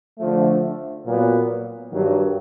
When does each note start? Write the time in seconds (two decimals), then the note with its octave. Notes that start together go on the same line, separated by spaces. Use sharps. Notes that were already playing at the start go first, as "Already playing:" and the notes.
0.19 D3 F3 A3
1.05 A#2 F#3 B3
1.91 G2 D#3 F#3